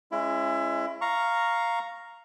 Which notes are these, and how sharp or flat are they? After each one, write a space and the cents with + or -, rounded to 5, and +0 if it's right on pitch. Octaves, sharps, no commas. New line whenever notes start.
G#3 +0 C#4 -15 E4 +25
F5 +0 A#5 +0 C#6 +0